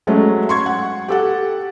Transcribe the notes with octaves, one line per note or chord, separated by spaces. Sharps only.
F#3 G#3 A3 C#4
C6 C#6 G#6
F#5
G4 A4 F#5